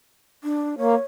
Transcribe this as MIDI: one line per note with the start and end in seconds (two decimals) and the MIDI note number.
0.44 0.75 62
0.78 0.95 58
0.78 1.02 73